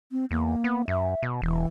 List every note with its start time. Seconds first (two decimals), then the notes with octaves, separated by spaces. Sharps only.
0.12 C4
0.31 E2 A#3
0.64 B3
0.88 F#2 E5
1.22 B2
1.42 E1 E3